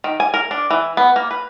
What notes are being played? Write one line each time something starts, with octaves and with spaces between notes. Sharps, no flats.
D#3
G#5
A#4
D4
E3
B3
A#3
B4